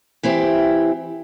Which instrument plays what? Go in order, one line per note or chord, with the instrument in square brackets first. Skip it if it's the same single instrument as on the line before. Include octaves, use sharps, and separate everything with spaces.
[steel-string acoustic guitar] E3 C4 E4 G4